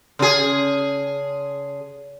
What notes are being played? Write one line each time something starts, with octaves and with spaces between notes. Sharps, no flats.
C#3 G#4